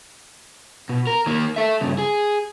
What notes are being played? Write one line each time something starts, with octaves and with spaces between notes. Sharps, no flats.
B2
A#4
D#3 A#3
A4 E5
G2 C#3
G#4